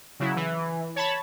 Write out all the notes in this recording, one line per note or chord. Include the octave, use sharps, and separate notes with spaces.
C#3 F#3 E4
E3
C#5 A5 B5